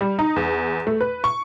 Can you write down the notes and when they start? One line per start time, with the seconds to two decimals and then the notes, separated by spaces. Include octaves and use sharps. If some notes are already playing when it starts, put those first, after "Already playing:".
0.01 G3
0.19 D#4
0.36 E2
0.87 A3
1.01 B4
1.24 C#6